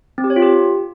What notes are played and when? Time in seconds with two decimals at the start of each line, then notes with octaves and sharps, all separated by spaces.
0.18 C4
0.24 G4
0.30 C#5
0.36 F4
0.42 G4